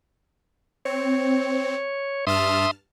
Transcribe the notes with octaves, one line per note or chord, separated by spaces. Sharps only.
C4 C#5
G2 E5 A5 C6 D#6 F6